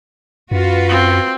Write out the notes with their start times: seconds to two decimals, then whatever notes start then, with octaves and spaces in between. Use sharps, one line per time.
0.51 F#2 F4 F#4 B4
0.88 C4